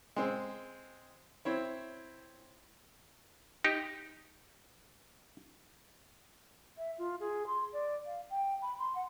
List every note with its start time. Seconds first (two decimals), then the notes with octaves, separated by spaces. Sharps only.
0.16 G#3 C4
1.45 C4 E4 C#5
3.64 D#4 G4
6.78 E5
6.98 F4
7.20 G#4
7.47 C6
7.73 D5
8.06 F5
8.30 G5
8.62 B5
8.79 C6
8.95 F#5